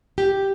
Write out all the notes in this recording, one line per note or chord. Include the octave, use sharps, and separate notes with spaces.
G4